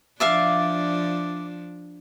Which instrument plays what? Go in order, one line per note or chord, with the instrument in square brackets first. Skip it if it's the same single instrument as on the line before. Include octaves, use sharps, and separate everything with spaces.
[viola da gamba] F3 D4 [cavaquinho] D5 E5 F5